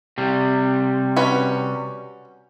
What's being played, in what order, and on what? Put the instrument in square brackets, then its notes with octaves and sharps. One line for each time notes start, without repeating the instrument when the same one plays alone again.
[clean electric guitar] C3 G3
[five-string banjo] C#4 F#4 B4